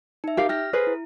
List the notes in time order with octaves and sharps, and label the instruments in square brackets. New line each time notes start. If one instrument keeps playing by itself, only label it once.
[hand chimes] D#4 E5
[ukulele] G4 A#4 F5
[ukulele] G4 [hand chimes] F6 A#6
[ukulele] G#4 B4 C5
[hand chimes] E4